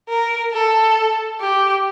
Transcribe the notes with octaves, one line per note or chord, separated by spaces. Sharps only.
A#4
A4
G4